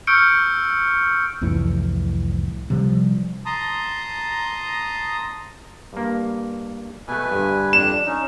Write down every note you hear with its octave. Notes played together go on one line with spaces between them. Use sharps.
C#6 E6 F6 G6 C#7 D7
C2 F2 A2 E3
C3 F3 G3
A5 A#5 C6 D#6
G2 A#3
B2 A3 B4 G#5
G2 D3
F2 D4 F#6 E7
C#4 D#4